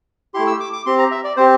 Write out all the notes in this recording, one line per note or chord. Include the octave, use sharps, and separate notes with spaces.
A3 E4 G4 C6
E6
D6
D6
C4 G4 C6
A#5
E5
D5
C4 G4 C5